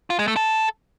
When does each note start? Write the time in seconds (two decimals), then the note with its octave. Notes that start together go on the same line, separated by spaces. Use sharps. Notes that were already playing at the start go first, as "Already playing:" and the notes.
0.10 F4
0.19 G#3
0.28 A3
0.36 A4